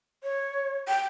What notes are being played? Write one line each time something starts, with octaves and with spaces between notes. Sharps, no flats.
C#5
G5